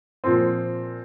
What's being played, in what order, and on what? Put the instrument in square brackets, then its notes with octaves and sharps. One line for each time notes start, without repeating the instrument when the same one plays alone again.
[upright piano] A#2 F3 C4